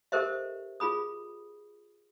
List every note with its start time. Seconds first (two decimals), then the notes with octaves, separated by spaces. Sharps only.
0.12 G4 A4 A#4 C5 D#5 E5
0.80 F4 G#4 B5 D#6